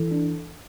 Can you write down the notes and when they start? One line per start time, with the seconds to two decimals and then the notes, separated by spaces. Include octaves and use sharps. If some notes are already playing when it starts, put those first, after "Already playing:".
Already playing: E3 A4
0.11 D4